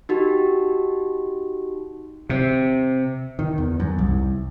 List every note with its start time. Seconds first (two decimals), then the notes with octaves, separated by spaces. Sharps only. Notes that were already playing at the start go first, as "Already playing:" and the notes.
0.09 D#4 F#4 G4
2.29 C3
3.39 D#3
3.58 E2
3.80 F#2
3.99 C2